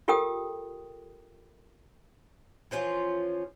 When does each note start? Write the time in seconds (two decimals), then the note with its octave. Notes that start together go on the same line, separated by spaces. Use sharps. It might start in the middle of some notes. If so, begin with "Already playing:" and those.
0.08 F4 G4 A4 A#4 G5 D#6
2.71 E3 F3 C#4 F4